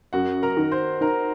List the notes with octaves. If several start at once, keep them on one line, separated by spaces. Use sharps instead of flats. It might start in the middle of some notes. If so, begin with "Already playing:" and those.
F#2 F#4 F#5
A#4 A#5
D#3
C5 C6
D#4 A#4 A#5